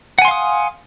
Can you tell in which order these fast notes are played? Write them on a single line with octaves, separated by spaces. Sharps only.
F#5 G#5 C6 F5 D#6